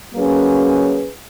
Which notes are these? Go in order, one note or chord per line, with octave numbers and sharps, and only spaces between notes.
F#3 A#3 C#4 G#4 B4